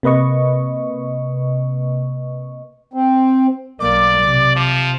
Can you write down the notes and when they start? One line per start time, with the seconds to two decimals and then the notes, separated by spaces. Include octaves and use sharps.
0.03 C3 A#3 B4 D#5 C#6
2.93 C4
3.80 B1 A#3 D5 D6
4.22 C3
4.56 F3